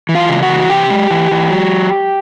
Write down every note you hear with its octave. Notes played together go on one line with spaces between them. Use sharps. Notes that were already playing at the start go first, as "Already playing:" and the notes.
E3
F4 F5
C#3
F#4 F#5
E3
C3 G4 G5
G#3
E3
E3
F#3